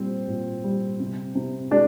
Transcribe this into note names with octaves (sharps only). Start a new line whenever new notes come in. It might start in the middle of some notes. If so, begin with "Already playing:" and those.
Already playing: A#2 G3 C4 C5
A#2
G3
C3
C3
G#3 D4 D5